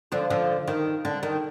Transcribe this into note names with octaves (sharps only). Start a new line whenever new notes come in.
D3 F3
D3 F3
D#3
D3
D#3